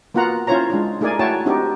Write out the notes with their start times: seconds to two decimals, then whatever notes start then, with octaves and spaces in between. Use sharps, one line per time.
0.14 A#3 B3 F4 F#4 F#5 A#5
0.47 C#4 E4 F4 C5 C#5 A#5
0.70 G#3 D4 F4
1.01 A3 D#4 G#4 A#4 D5 G#5
1.19 A3 E4 F#4 C#5 G5 A5
1.46 C4 D4 D#4 F#4 G4